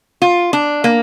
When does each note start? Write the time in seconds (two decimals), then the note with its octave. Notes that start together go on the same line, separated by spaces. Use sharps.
0.22 F4
0.53 D4
0.84 A#3